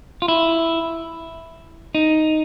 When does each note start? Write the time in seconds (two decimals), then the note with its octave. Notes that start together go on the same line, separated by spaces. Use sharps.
0.22 F4
0.28 E4
1.95 D#4